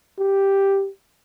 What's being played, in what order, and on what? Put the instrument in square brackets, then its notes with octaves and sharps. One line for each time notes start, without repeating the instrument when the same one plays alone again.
[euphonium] G4